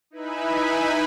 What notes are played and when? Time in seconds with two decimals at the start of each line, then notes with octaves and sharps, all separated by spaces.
0.11 D#4 E4 B4 E5 G#5 B5